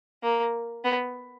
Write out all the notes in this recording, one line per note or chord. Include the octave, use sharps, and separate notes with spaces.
A#3
B3